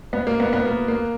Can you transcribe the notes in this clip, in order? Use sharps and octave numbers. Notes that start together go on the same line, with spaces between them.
B3
A#3
B3
B3
A#3
A#3